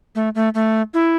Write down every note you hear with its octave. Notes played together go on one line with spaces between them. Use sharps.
A3
A3
A3
E4